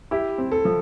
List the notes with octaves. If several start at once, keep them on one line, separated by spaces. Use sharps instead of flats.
E4 G4
C4
A4
F3